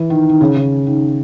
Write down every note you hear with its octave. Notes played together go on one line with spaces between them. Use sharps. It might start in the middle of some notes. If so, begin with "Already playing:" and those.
Already playing: E3
D#3
D#3
C#3
C#3
D#3